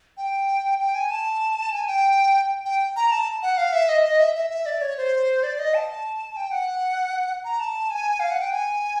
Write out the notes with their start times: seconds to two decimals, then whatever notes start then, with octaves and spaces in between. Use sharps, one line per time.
0.17 G5
0.79 G5
0.95 G#5
1.11 A5
1.72 G#5
1.87 G5
2.65 G5
2.96 A#5
3.11 A5
3.42 F#5
3.57 F5
3.73 E5
3.89 D#5
4.04 D#5
4.20 E5
4.35 E5
4.50 E5
4.66 D5
4.82 C#5
4.97 C5
5.43 D5
5.59 D#5
5.74 A5
6.37 G5
6.52 F#5
7.45 A#5
7.60 A5
7.91 G#5
8.20 F5
8.31 F#5
8.42 G5
8.53 G#5